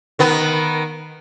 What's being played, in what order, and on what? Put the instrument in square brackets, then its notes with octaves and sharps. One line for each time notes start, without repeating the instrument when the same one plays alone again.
[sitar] D#3 B3